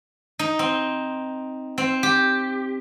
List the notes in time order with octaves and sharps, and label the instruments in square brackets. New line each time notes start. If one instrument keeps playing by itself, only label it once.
[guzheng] D#4
C4
C4
G4